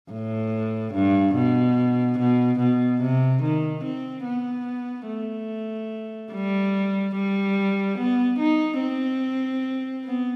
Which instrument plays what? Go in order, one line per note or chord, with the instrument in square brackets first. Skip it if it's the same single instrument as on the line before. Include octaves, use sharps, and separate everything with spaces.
[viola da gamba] A2
G2
B2
B2
B2
C3
D#3
C4
B3
A3
G3
G3
B3
D#4
C4
B3